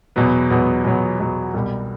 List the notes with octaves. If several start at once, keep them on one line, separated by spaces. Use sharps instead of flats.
E2 B2 F#3 B3
E2 B2 F#3 B3
E2 B2 F#3 B3
E2 B2 F#3 B3
C2 B2 G3